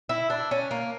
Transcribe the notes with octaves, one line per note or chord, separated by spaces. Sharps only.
E4
D4
C#4
A#3